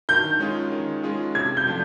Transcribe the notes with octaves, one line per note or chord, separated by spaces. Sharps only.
D#3 G6
G#3 C#4 F4 G#4
D#3
G#3 C#4 F4 G#4
C3 G#6
G6
F3 A3 D4 F4